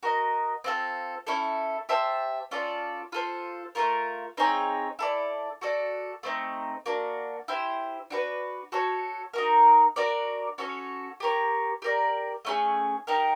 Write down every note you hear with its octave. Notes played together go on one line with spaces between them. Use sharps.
F#4 A#4 D#5
C4 F4 A4
C#4 E4 A4
G4 C5 E5 A5
C#4 F4 A4 D5
F4 A4 C5
A3 C#4 F4 A#4
C4 D#4 G#4 C#5
E4 A4 D5
F#4 A4 D5
A3 C4 D#4
A#3 D4 F#4
E4 G4 C5
D4 F#4 B4
F#4 A4 C#5
D#4 F#4 A#4
D4 F#4 A#4 D5
C#4 F#4 A4 C#5
G4 A#4 C#5
G4 A#4 D5
A3 C#4 E4 G#4
D#4 G4 A#4